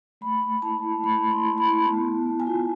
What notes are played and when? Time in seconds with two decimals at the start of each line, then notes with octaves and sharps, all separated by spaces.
0.21 A3 B5
0.41 A3
0.62 E4 A5
0.83 E4
1.04 A3 B5
1.24 A3
1.30 C6
1.44 E4
1.58 B5
1.65 E4
1.85 B3 A5
2.06 B3
2.26 B3
2.40 G#5
2.47 F4